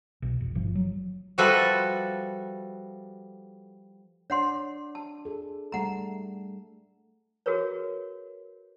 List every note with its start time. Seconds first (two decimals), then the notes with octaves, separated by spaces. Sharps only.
0.22 B1
0.41 F1
0.55 G1 F3
0.75 F#3
1.38 F3 G3 F#4 A4 B4 E5
4.30 D4 C#5 D5 F#5 C6
4.95 A5
5.25 G#4 A4
5.72 G3 A3 A4 F#5 A#5
7.46 F#4 G#4 A#4 B4 C#5